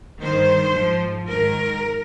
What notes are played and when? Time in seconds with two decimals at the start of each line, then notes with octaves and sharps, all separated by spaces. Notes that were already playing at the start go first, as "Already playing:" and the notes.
0.22 G2 D#3 C5
0.76 G#2 F3
1.29 G#2 D#3 A#4